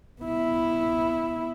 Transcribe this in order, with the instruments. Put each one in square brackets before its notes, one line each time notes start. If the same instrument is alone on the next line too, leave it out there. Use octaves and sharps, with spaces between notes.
[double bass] B3 E4